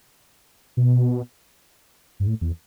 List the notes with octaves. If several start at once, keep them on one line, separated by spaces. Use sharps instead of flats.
B2
G2
A2
E2